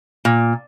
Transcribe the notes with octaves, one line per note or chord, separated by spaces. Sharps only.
A#2